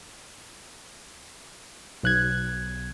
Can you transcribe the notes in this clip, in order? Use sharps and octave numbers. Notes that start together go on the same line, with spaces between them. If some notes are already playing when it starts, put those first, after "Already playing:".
B1 F#6 G#6